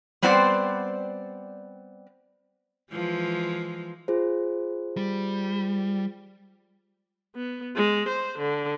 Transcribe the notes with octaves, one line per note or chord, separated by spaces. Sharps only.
G3 B3 C4 C5 D5
E3 F3 G#3
F4 G#4 C5
G3
B3
G#3
C5
D3